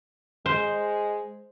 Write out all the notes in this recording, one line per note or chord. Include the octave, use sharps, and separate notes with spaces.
G#3 C5